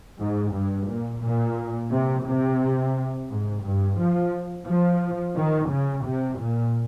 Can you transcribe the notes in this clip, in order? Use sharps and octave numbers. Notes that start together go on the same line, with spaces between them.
G#2
G2
A#2
A#2
C3
C3
G#2
G2
F3
F3
D#3
C#3
C3
A#2